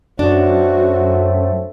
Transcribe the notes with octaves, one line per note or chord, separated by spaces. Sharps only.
F#2 F#3 A3 C4 D4 F#4